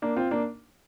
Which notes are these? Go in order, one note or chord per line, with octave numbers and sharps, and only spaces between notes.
A#3 D4
C4 F4
A#3 D4